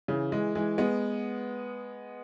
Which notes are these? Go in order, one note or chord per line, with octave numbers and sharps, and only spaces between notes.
C#3 E3
E3 G#3
E3 G#3
G#3 B3